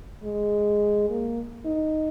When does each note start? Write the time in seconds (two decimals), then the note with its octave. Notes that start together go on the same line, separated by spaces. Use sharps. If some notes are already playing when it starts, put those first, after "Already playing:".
0.23 G#3
1.10 A#3
1.66 D#4